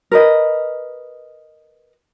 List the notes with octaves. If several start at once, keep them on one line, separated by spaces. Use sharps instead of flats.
A#4 B4 D#5